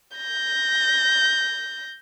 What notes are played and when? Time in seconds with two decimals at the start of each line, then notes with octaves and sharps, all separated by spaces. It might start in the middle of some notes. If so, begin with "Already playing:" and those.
0.18 G6 A#6